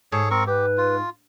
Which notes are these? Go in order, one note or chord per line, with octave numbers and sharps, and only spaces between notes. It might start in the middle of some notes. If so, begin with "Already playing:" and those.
G#2 G#4 A4 C#5
C4 A#4 C#6
G4 B4
F4